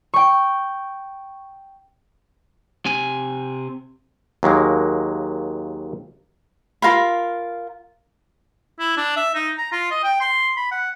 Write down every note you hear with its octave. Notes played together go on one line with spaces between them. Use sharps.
G5 C#6
C3 G#5
D#2 F#3 G#3 A#3
F4 A#4 F5 B5
E4
D4
E5
D#4
A#5
F4
D#5
G5
C6
B5
F#5